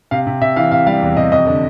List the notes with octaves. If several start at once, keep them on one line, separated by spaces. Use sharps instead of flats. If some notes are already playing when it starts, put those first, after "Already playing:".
C3 F5
C3
C3 E5
E3 F5
C3 F5
G3 F5
E2
C3 D#5
F2 D#5
D3